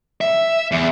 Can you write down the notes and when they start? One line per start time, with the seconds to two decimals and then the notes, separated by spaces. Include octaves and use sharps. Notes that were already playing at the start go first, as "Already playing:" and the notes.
0.21 E5
0.71 E2